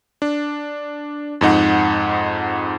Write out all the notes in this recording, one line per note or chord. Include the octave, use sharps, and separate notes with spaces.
D4
F2 G#2 D#4 F#5